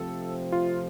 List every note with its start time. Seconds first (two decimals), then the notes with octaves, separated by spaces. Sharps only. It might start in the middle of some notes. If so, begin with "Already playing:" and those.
Already playing: C3 F3 A3 C4 A4
0.52 F4